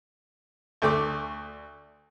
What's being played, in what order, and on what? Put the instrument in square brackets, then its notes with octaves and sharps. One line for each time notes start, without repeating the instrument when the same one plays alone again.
[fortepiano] D2 A3 D6